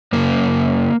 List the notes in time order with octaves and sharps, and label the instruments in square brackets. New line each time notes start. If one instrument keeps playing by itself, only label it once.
[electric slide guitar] F#2 C#3 A#3